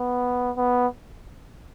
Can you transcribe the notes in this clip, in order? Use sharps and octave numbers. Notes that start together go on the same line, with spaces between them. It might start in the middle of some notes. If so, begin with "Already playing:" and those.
Already playing: B3
B3